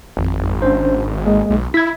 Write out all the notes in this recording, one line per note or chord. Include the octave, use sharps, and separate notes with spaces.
G#1 F2
C#4 D4 C5
G#3 A#3
B1
E4 G#6 B6